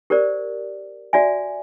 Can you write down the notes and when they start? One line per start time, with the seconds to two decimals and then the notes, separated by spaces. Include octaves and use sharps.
0.10 G4 A#4 C5 D5
1.13 F#4 D5 E5 G#5